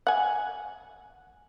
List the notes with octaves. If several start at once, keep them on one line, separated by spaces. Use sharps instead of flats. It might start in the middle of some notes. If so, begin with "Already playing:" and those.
F#5 G#5